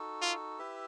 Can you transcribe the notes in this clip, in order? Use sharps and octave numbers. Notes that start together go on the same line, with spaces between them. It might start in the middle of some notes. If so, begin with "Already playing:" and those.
Already playing: D#4 F#4 A4
F4
E4 G4 B4 E5